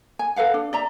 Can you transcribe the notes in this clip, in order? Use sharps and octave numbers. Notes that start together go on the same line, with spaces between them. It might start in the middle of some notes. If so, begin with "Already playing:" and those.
G#5
A4 B4 F5 F#5
D4
D5 E5 A#5